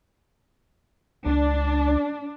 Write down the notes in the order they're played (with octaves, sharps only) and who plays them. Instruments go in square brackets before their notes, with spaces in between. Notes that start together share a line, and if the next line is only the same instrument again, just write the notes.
[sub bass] C#2 [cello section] D4